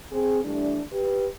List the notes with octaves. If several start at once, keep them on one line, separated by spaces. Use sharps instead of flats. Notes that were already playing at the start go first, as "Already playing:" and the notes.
C4 G#4
E3 G3 A3 D4
G4 B4